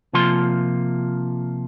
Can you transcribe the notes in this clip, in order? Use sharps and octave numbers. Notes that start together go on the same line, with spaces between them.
C3 F3 A#3 F4 C6